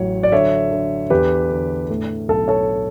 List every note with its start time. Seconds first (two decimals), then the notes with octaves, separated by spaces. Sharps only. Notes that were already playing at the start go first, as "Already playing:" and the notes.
Already playing: A1 F#3 C#5
0.23 D5
0.32 D3 C#5 E5
0.71 D3
1.10 E2 G4 B4
1.51 D3
1.89 A2
2.28 B1 A4
2.48 A4 C#5